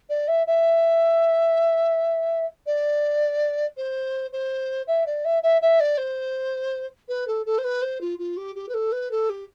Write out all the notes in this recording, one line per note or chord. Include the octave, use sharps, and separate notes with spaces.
D5
E5
E5
D5
C5
C5
E5
D5
E5
E5
E5
D5
C5
B4
A4
A4
C5
B4
C5
F4
F4
G4
G4
B4
A4
B4
A4
G4